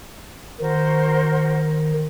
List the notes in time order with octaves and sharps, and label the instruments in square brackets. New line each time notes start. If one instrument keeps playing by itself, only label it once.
[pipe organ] D#3 [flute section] F#4 A#4 C5